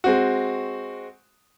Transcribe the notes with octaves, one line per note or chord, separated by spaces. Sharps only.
G#3 C4 F#4